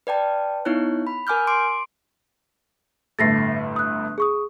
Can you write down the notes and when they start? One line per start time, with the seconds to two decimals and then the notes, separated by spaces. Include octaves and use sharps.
0.07 B4 D5 G5 A5
0.65 B3 D#4 E4 C#5 F#6
1.07 B5
1.27 A#4 G#5 D6 F6 G6
1.47 C6 D6 D7
3.19 G1 A2 A3 A6 A#6 C7
3.76 D#6 F#6
4.18 G#4 C#6 D#6